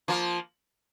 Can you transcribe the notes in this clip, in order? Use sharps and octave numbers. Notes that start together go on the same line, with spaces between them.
F3 A#3